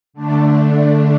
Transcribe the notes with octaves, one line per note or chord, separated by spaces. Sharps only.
D3 A3 D4